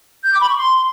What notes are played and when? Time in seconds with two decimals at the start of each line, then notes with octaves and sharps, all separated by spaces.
0.24 G6
0.33 D6
0.41 B5
0.50 C#6
0.58 C6